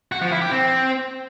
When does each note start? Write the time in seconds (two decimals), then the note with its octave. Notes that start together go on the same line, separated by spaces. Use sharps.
0.12 F#4
0.22 F3
0.32 E4
0.41 G4
0.51 C4